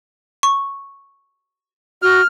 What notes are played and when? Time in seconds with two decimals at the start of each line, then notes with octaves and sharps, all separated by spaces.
0.43 C#6
2.02 F#4 F6